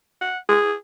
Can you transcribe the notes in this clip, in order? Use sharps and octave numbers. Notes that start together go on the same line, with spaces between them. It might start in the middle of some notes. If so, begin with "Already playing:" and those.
F#5
G#4